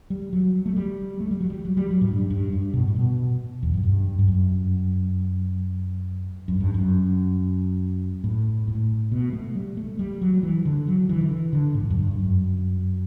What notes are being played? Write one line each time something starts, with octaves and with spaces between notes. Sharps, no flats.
G3
F#3
A3
G3
A3
G3
F#3
G3
F#3
G3
F#3
A2
G2
G2
G2
B2
A2
B2
E2
F#2
G2
G2
F#2
F#2
G2
F#2
A2
A2
B2
A3
G3
A3
G3
F#3
E3
D3
F#3
E3
D3
E3
D3
A2
G2
F#2
G2
F#2